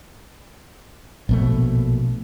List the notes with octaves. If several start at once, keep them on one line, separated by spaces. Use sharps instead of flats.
A#1 B2 A3